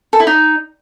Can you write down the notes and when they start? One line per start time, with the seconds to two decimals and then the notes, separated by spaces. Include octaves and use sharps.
0.13 A4
0.20 E4
0.27 D#4